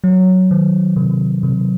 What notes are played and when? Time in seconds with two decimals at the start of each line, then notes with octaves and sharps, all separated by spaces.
0.04 F#3
0.51 D#3
0.96 C3
1.43 C3